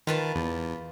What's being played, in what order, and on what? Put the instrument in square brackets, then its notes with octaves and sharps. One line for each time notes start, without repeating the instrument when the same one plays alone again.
[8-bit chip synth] D#3 [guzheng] F4 B4 A5
[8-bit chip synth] E2